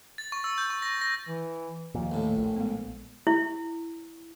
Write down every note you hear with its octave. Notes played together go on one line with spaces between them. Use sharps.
A6
C#6
E6
G6
C#6
A#6
A#6
E3
D#2 A#2 F3
A1 A2
A#1
G#3 B3
E4